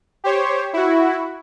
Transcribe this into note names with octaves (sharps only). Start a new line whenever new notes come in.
G4 C5 C#5
E4 F#4